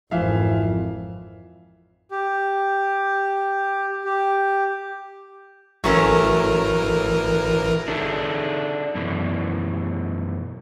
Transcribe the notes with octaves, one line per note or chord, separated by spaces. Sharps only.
G#1 F2 E3 F3 E5 F5
G4
G4
A1 E3 F#3 A3 C#4 A#4
D4 D#4 G#4 A4 C#5 E5
F#2 B2 E3